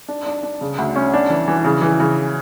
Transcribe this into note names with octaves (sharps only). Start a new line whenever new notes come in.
D4
D4
D4
C#3
D2
C#4
D4
E3
E3
C#3
E3
C#3